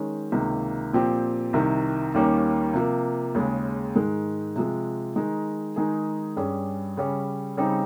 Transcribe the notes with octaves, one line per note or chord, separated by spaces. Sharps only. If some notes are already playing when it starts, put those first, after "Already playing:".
Already playing: D#3 G#3 C#4
C#2 C3 D#3 A#3
A#2 F3 C4 G4
C2 C3 D#3
D#2 D#3 G3 A#3 C#4
C3 F3 A#3
D#2 C#3 G#3
G#2 D#3 G#3
C3 F3 G#3
D#3 G#3 D#4
D#3 G#3 D#4 G#4
G2 G3 C#4 G#4
C#3 G3 C#4
C#3 G3 C4 D#4